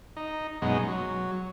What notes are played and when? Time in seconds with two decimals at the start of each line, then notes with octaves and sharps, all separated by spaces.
0.17 D#4
0.62 F#2 B2 G#3 D#4
0.88 F#3